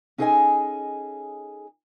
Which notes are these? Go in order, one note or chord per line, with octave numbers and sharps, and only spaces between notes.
C#4 D#4 G#4 A4 D#5 G#5